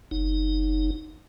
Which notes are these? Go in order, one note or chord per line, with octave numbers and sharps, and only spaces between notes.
F#1 D#4